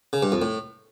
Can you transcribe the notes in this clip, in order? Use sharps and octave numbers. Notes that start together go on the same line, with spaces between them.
C#3
G2
F2
A2